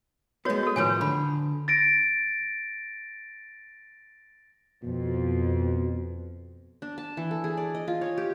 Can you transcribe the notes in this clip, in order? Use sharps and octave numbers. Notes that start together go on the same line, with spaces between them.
G#3 B3 F#4 C#5
F#4 A4
A2 D#3 F3 B4 C#5 G#5
D3 B5
A6 A#6 D7
F2 B2
D4
A5
E3
A4
G#4
D5
D#5
F4
C#5
G4